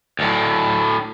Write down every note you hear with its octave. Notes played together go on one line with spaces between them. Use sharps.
D2 A2